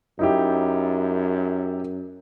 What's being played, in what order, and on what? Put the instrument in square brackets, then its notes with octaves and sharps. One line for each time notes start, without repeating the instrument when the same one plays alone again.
[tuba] F#2 [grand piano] D#4 E4 G4